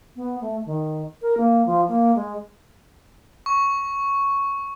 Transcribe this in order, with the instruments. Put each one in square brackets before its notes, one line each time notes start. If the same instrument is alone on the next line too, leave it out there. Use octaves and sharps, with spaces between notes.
[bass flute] B3
A3
D#3
A#4
A#3
F3
A#3
G#3
[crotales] C#6